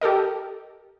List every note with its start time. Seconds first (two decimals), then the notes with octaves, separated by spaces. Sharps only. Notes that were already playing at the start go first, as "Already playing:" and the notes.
0.01 G4 A4 A#4 D#5